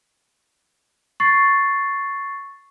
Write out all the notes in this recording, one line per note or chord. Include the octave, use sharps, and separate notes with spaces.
C#6 A6 C7